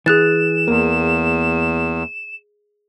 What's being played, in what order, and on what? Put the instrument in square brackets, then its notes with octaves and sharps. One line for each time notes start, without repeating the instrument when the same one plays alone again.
[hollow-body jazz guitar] E3 [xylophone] G#4 F#6 A6 [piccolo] E7
[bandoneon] E2 [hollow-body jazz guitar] A#3